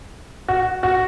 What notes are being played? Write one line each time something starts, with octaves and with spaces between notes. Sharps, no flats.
F#4
F#4